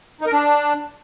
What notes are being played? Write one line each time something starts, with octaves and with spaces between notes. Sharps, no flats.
D#4
A#4
D4